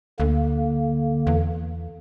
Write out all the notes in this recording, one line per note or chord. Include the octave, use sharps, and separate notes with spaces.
D2 D3 A#3
E2